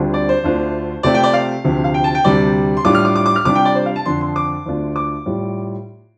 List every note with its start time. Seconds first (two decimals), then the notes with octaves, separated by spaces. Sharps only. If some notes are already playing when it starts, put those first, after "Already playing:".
Already playing: D2 D3 G3 C4 F4
0.14 D5
0.29 C5
0.44 D2 D3 A3 D4 F4
1.03 C3 A3 C4 F4 D5
1.15 G5
1.23 D5
1.33 F5
1.64 D2 C3 F3
1.84 F5
1.94 G5
2.04 A5
2.15 G5
2.24 D2 C3 G3 D5
2.77 C6
2.85 A2 G3 D4 F4 D6
2.95 F6
3.05 D6
3.16 D6
3.26 D6
3.36 F6
3.45 C3 G3 D4 F4 D6
3.55 G5
3.65 D5
3.75 C5
3.86 F5
3.96 A5
4.06 F2 D3 F3 C6
4.21 C6
4.36 D6
4.66 D2 D3 A3 D4 F4
4.96 D6
5.26 A2 G3 F4